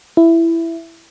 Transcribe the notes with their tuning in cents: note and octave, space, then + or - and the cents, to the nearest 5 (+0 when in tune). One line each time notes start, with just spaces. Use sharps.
E4 +10